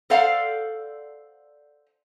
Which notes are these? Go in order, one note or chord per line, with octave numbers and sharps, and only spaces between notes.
A4 C5 D5 F5 F#5